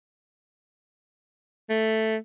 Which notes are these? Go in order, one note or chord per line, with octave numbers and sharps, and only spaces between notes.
A3